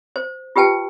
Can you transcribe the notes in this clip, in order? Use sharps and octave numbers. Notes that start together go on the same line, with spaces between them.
C5
F4 G4 B4 G5 A5